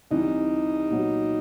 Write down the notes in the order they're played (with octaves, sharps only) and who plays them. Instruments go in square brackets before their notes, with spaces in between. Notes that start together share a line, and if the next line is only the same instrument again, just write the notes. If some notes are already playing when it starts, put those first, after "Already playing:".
[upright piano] C2 C3 E3 [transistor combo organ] D#4
[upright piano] A#2 F#3 B3